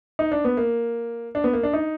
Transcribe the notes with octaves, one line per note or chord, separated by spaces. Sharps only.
D#4
D4
B3
A#3
D4
B3
A#3
D4
D#4